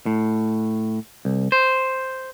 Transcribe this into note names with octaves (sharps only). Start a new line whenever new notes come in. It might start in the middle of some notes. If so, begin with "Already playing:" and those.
A2
C2
C5